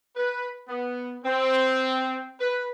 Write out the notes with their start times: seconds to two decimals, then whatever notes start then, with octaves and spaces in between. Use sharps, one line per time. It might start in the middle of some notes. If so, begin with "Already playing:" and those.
0.17 B4
0.68 B3
1.24 C4
2.40 B4